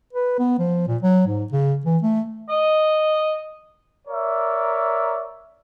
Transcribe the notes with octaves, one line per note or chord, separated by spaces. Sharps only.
B4
B3
F3
A#2
F#3
G#2
C#3
E3
A3
D#5
A#4 C#5 D5 E5